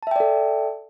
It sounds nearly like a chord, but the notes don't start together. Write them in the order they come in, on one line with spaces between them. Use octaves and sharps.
A5 E5 G5 D5 A4